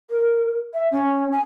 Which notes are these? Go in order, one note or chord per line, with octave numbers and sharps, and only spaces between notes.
A#4
E5
C#4
G#5